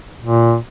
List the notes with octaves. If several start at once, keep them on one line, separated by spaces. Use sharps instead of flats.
A#2